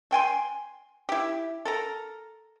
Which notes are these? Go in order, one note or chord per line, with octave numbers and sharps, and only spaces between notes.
A3 G5 G#5 C6
E4 G4
A4 A#4 A#5